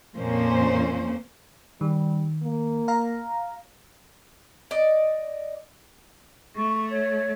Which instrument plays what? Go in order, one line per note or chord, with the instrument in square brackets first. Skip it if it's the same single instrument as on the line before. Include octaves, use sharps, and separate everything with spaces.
[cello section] F2 A#2 F3 A#3 C#4 C5
[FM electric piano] D#3 [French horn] G3
[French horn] A#3
[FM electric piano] F5 A#5
[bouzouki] D5 D#5
[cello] A3 [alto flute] C#6
[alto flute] C#5